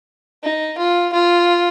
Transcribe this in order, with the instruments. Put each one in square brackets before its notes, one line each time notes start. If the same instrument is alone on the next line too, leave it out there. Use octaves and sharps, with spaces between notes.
[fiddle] D#4
F4
F4